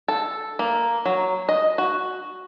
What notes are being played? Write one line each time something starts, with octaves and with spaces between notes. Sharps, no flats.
A4
A#3
F#3
D#5
F#4